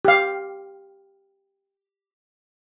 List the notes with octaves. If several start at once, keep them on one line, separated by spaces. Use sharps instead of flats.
G4 F5